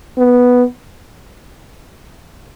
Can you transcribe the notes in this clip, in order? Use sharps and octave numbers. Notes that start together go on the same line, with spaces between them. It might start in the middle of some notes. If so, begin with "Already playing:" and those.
B3